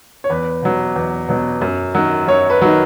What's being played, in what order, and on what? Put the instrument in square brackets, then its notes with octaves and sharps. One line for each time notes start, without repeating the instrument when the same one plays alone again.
[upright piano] C#5
E2 B4
B2 F#3
E2
B2 F#3
F#2
D#3 F#3
F#2 C#5
B4
D#3 F#3